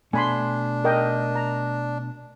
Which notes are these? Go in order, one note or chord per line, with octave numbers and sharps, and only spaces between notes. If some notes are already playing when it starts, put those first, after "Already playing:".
B2 A3 D4 G#5 B5 C6
A#4 D#5 G5
A#5